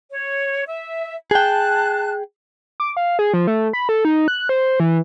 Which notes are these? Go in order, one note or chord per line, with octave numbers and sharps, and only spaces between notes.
C#5
E5
G#4 G5 A5 F#6
D6
F5
G#4
F3
A3
B5
A4
D#4
F#6
C5
E3